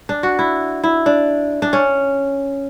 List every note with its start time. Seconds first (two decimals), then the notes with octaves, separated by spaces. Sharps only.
0.09 D4
0.23 F#4
0.39 E4
0.84 E4
1.06 D4
1.62 D4
1.73 C#4